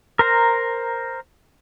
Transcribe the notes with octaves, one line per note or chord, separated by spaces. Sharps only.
A#4 C5 A#5